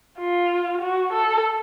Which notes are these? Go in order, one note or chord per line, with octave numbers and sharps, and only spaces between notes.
F4
F#4
A4